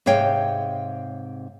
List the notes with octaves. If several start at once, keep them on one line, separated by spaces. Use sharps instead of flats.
G#2 C3 C#5 F5 G5